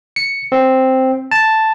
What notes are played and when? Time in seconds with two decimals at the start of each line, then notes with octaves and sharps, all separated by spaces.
0.16 C#7
0.52 C4
1.31 A5